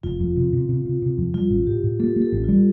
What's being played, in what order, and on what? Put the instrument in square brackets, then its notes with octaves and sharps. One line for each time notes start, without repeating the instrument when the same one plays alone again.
[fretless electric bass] F1 [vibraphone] F4
[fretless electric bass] F2
C3
C3
C3
C3
C3
F2
[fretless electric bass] G3 [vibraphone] F4
[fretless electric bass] A1
[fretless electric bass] A2 [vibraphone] G4
[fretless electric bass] A2
[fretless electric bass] A#3 [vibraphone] A4
[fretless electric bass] A#3
[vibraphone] A4
[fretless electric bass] A1
[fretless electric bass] G3 [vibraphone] F4